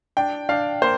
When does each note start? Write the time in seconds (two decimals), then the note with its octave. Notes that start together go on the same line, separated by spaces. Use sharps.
0.17 D4 G5
0.49 D4 F5
0.82 A#3 C5